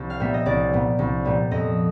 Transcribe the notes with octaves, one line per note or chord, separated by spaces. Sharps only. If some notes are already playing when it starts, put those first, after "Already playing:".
Already playing: C2
F5
A#2 G3 B3 E5
D#5
C2 D5
A#2 G3 B3
C2
A#2 G3 B3
F2 D#5